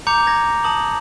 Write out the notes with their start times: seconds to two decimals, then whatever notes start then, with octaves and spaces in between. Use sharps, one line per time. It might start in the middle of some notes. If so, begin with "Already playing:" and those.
0.07 A#5 D6 G6 C#7 F7
0.27 G#6 A#6
0.64 A5 D#6 F#7